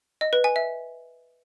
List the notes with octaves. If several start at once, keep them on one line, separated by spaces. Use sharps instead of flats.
D#5
B4
G#5
E5